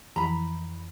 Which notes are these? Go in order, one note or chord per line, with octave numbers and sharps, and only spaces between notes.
F2 E3 A#5 B5